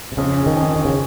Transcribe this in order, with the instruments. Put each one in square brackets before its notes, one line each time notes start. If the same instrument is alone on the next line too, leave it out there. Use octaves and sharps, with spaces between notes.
[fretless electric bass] C3
[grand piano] F2 [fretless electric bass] C#3
[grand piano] C#4
[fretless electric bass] D#3
[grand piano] F2
[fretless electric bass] D#3 [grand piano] C#4
[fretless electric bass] C#3